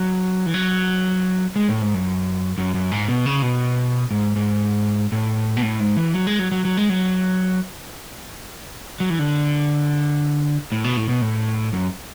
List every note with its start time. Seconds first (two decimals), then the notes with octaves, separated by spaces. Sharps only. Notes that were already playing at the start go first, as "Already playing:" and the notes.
Already playing: F#3
0.46 E3
0.54 F#3
1.56 G#3
1.69 A2
1.82 G#2
1.94 F#2
2.58 F#2
2.74 F#2
2.91 G#2
3.09 B2
3.26 C#3
3.42 B2
4.11 G#2
4.36 G#2
5.12 A2
5.57 B2
5.62 A2
5.80 G#2
5.97 E3
6.14 F#3
6.27 G#3
6.39 F#3
6.52 F#3
6.65 F#3
6.77 G#3
6.90 F#3
9.00 F#3
9.10 E3
9.19 D3
10.72 A2
10.84 B2
10.97 A2
11.09 B2
11.21 A2
11.73 F#2